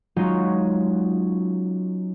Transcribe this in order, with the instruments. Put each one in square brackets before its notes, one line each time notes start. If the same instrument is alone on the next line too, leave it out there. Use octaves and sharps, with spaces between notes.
[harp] F#3 G#3 C#4 D#4 F4 F#4